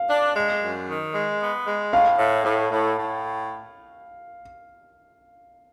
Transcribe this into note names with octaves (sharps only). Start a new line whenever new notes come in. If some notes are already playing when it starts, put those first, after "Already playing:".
Already playing: F5
D4
G#3
F#2
D#3
G#3
B3
G#3
A2 F5
A2
A2
A2
A2